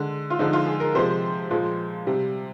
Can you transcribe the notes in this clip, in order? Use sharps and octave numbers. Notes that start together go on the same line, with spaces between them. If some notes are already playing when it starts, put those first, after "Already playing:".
Already playing: D3 G#3
F4
D3 F3 G#3 D#4
F4
G#4
A#4
C3 F3 G#3 C5
A#2 F3 G#3
C3 G3